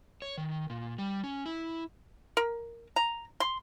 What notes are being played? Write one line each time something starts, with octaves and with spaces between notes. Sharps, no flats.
C#5
D#3
A#2
G3
C#4
E4
A#4
A#5
C6